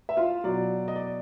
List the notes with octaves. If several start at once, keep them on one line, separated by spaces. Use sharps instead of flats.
E5
F4 F5
B2 F#3 D5
D#5
D5